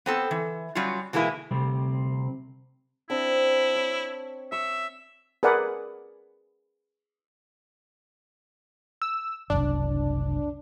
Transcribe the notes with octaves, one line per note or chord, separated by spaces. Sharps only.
B3 C4 A4
E3
F#3 G3 C#4 F4
B2 E3 G#3 A#3 E4
D2 C3 G3 C4
C4 D4 E4
C#5
E5 C#6
G#4 A#4 B4 D5 F#5
E6
F#1 C2 D4